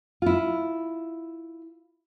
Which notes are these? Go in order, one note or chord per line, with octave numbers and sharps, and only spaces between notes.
E4 F4